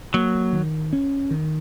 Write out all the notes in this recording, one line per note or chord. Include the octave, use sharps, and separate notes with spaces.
F#3 A#3
D#3
C#4
D#3